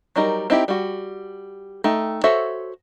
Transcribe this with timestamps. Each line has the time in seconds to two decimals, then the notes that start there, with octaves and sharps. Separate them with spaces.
0.16 F#3 G3 D#4 A#4
0.50 C4 D#4 E4 G4
0.68 G3 F#4
1.84 A3 D#4 G5
2.24 F#4 A4 C5 C#5 E5